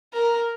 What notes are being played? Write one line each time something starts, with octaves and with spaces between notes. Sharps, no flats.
A#4